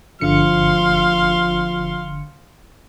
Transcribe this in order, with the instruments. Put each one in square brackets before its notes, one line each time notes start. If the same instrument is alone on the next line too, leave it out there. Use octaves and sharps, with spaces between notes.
[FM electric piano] G1 D3 C#7 [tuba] F3 [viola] F5 C6